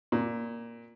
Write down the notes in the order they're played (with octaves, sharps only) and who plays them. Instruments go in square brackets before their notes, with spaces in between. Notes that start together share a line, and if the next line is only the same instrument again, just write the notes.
[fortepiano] A#2